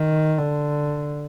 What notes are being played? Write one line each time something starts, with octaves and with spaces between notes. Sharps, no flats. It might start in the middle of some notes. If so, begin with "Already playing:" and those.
Already playing: D#3
D3